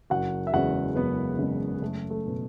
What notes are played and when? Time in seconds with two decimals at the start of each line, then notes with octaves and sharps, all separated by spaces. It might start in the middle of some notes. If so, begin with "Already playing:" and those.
0.10 F#1 F#4 F#5
0.47 E5
0.53 E2 C#3 G#3 F#4 F#5
0.95 F#1 B3 B4
1.39 E2 C#3 G#3
1.74 G#4
1.81 F#1 A3 A4
2.10 A3 A4
2.27 B2